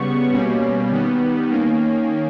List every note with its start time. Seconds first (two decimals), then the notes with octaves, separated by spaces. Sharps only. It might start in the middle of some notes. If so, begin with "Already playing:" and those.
Already playing: C#3 G3 B3 C#6
0.32 B2 G3 A#3 C#4
0.91 D#3 G3 B3
1.49 D#3 A#3 C#4